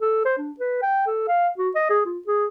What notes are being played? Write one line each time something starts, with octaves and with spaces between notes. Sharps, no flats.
A4
C5
D4
B4
G5
A4
F5
F#4
D#5
G#4
F4
G#4